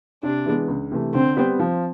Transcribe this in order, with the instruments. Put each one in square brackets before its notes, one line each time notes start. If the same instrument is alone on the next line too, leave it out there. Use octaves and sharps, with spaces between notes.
[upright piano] C3 [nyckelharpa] D4
[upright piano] E3 G#3 B3
C#2
C3 E3 A3
[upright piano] D3 [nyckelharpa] C4
[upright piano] G3 B3
F3